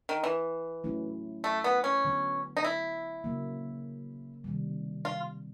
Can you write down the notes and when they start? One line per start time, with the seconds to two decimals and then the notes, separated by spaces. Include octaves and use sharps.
0.09 D#3
0.24 E3
0.84 F#3 A3 C#4 E4
1.44 A3
1.64 B3
1.84 C#4
2.05 D3 F#3 B3
2.57 D#4
2.64 E4
3.24 C#3 F#3 A#3
4.44 C3 D#3 G3
5.05 F4